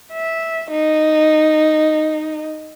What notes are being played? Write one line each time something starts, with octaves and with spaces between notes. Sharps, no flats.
E5
D#4